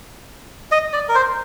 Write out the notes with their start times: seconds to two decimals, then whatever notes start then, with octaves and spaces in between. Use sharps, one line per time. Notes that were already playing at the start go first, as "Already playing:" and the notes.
0.72 D#5
0.93 D5
1.09 A#4
1.15 C5